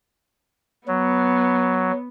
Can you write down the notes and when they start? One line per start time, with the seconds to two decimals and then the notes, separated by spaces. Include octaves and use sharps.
0.88 F#3 B3